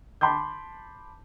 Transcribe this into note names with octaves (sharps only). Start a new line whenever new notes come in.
A5 B5 C6 D6 G6